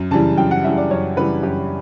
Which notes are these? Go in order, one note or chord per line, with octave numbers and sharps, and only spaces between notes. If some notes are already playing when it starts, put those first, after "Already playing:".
Already playing: F#2
C#3 E3 G3 A5
F#2 G5
F#5
C#3 E3 G3 E5
D5
F#2 C#5
C#3 E3 G3 B4
F#2 G4